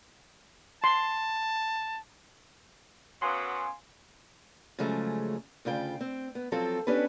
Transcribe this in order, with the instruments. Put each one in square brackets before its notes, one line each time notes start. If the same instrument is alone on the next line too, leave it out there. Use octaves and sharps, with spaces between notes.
[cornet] A5 [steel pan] C6
[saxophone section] F#2 F#3 B3 [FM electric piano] F5 G#5 C6
[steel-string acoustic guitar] C#3 F3 F#3 G#3 A3
D2 C#3 F4 G5
C4
B3
F3 F#3 C4 F4 A4
B3 C#4 D4 G4 B4